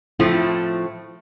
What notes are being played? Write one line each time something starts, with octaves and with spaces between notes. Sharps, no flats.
A2 F3 A3 C4 E4